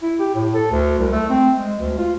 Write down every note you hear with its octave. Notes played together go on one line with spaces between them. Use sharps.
E4
G4
A2
A4
D2
C2
A3
C4
G#3
D2
F4